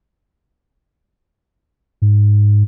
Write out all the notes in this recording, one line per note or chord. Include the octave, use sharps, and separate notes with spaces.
G#2